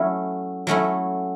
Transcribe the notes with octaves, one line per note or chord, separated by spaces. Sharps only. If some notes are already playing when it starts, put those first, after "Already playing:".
Already playing: F#3 A3 C#4 E4
F#3 A3 C#4 E4